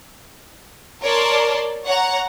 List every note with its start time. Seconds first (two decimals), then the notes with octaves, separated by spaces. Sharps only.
1.03 A#4 C#5 D5 A5 C6
1.86 C#5 F#5 A#5